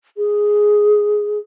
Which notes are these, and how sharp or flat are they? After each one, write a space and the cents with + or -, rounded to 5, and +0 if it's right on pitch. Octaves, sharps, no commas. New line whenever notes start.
G#4 +5